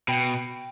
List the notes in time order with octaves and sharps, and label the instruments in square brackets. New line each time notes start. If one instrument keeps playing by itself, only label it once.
[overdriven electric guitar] B2 [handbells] G5